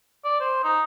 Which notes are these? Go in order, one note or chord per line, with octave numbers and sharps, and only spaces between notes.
D5
C5
D#4